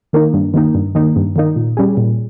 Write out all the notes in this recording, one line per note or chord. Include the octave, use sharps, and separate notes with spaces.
D#3 A#3 D#4
G2
D#3 A#3 D#4
G2
D#3 A#3 D#4
G2
D#3 A#3 D#4
A#2
G3 C#4 G#4
A#2